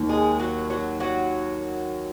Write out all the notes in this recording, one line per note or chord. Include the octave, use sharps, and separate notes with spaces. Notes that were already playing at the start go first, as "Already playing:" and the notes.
Already playing: D#2 D#3 A#3
G#3 G#4
F#3 F#4
F#3 F#4
F#3 F#4